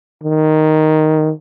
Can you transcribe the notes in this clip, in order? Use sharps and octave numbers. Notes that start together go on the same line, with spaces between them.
D#3